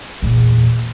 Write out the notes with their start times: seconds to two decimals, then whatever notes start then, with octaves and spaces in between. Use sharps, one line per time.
0.22 E2 A#2